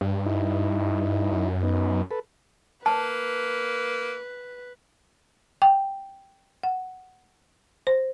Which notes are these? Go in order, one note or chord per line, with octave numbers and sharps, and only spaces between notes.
G2
D#4 E4
F#2
B3 D#4
A4 B4
A#3 B4 A5
G5
F#5
C5